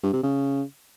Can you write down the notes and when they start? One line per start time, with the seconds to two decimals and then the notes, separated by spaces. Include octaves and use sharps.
0.03 G2
0.13 C3
0.23 C#3